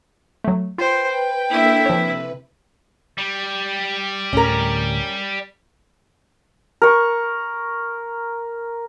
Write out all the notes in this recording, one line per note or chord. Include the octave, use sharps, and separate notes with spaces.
F#3 A3
F4 B4 C5 G5
G5
A#3 D4 E4 A4 E5
C3 F3 B4 C#5
G3
D2 A2 D3 C#4 A#4
A#4 C#6